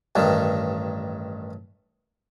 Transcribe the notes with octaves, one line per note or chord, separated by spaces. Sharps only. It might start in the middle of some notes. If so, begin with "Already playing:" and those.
A1 G2 D#3